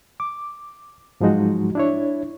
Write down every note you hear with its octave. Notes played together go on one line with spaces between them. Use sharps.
D6
G#2 F3 F#3 G#3 D#4 F#4
D4 E4 C#5